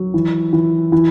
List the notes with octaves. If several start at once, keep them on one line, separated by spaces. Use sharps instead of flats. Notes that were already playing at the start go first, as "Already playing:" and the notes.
Already playing: F#3
E3
E3
E3